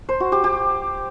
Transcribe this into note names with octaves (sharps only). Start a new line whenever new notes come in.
C5
F#4
G4
G4